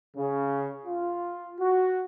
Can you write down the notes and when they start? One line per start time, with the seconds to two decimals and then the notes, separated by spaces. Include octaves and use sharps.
0.17 C#3
0.86 F4
1.60 F#4